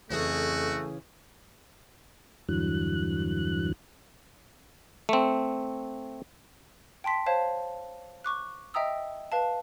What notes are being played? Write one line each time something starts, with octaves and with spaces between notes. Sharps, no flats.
F2 C#3 E3 A3 F#4 G#4
E2 G2 D3 E3 F#3 F#6
A3 C4
G5 A5 C6 B6
C5 C#5 F5 A5
C#6 D6 F#6
D#5 E5 G5 A#5 D#6 E6
B4 F5 A5